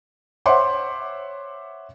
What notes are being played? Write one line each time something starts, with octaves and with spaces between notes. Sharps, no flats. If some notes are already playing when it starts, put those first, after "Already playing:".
C5 C#5 E5 F#5 C6 D6